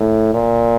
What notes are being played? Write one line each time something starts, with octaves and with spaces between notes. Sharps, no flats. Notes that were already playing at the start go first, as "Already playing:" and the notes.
Already playing: A2
A#2